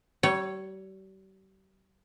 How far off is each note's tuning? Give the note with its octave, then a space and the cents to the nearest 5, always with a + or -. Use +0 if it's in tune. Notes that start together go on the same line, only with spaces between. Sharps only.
G3 -40 C#5 +0